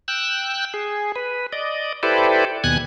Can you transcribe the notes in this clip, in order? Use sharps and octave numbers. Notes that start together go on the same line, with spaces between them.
G5 E6 F#6
G#4
B4
D5 D#5
E4 G4 A4 B4 C5 D5
D#2 B2 G#5 F#6 G#6